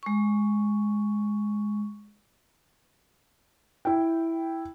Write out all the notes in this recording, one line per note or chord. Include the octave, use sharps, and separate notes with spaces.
G#3 C#6
E4 G5